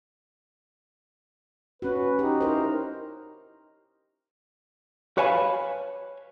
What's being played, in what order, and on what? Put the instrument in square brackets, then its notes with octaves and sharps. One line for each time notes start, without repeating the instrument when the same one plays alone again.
[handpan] C#4 F#4 [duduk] B4
[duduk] D#4 [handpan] G4
[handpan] E4 A#4 C5
[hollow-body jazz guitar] B4 C#5 F5 G#5 A5 B5